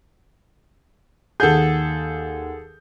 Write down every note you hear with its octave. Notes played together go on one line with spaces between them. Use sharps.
D#2 G#4 A4 F#5 G6